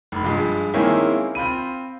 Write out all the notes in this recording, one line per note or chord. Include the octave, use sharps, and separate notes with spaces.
F1 B5
G2 F3 G#3
D#3 G#3 A#3 C4 C#4 E4
C4 F4 B5 D#7